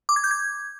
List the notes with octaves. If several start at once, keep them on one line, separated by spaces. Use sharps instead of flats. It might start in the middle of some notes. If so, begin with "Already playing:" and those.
D6
G#6
G6
G#6